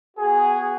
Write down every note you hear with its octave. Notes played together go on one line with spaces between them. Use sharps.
B3 F#4 G#4